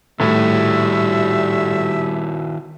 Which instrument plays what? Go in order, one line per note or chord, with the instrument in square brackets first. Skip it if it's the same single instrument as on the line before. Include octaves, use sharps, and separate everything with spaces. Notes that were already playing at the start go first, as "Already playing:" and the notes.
[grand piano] A2 [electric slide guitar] D#3 E4 F#4 [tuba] G3 [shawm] E5